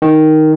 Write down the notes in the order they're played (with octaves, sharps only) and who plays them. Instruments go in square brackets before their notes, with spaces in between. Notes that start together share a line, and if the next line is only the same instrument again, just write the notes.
[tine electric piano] D#3